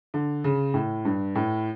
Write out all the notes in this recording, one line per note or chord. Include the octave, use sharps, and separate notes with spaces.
D3
C#3
A2
G2
A2